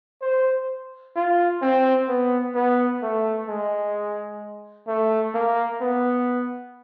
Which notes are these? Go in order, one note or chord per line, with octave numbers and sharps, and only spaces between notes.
C5
F4
C4
B3
B3
A3
G#3
A3
A#3
B3